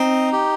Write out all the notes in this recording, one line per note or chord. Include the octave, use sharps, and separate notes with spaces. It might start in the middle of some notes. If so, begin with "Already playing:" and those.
Already playing: C4 D#4 D#5
G4